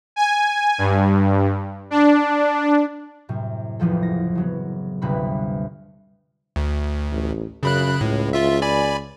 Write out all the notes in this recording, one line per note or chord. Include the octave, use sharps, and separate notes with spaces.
G#5
G2
D4
F#2 A2 C3
F#1 E2 F3 A4
A#6
C#3 F#3 B3
G1 D2 C3 B4 B5
D2
A1
F#2 C#3 B5 F#6
C#2 A2
F4 E5
D5 G#5 B5